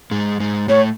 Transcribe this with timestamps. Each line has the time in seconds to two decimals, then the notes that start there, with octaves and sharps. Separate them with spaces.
0.11 G#2 G#3
0.40 G#2 G#3
0.68 A2 A3 C#5